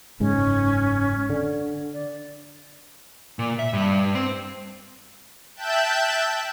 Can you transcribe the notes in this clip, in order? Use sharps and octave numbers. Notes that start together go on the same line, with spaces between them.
F#1 G#2 G#3 C#4
D3
D5
A#2
E5
G2
C4
E5 G5 A5 F#6 G6 E7